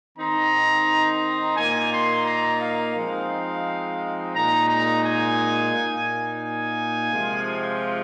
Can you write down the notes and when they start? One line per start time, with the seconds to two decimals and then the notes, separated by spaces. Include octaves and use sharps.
0.18 D#3 C4 D#4 A#5
1.57 A#2 A#3 D#4 G#5
1.92 C6
2.26 A#5
2.61 F5
2.96 F3 G#3 C4 D#4
4.35 A#2 G#3 D#4 A#5
4.70 A#5
5.05 G#5
5.74 A#2 A#3 D#4
6.44 G#5
7.13 C3 F3 G#3 F4